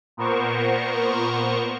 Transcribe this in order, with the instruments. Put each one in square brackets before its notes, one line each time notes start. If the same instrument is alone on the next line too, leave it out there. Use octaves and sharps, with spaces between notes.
[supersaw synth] A#2 B3 A#4 C5 C#6